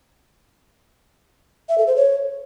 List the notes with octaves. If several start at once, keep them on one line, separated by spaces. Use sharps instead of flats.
E5
A4
C5
C#5